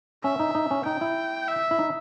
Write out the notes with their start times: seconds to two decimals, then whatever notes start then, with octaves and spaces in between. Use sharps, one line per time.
0.24 C#4 E5
0.40 D#4
0.55 D#4
0.71 C#4
0.85 D#4 G5
1.01 E4
1.48 E5
1.71 E4
1.79 D#4